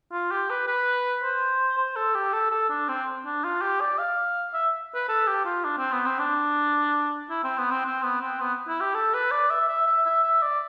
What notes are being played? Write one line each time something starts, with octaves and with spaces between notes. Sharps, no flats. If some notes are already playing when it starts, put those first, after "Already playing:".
F4
G4
B4
B4
C5
C5
A4
G4
A4
A4
D4
C4
D4
F4
G4
D5
F5
E5
B4
A4
G4
F4
D4
C4
B3
C4
D4
E4
C4
B3
C4
C4
B3
C4
B3
E4
G4
A4
B4
D5
E5
E5
E5
E5
E5
D5